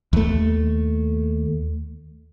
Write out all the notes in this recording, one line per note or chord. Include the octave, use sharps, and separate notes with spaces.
D#2 A3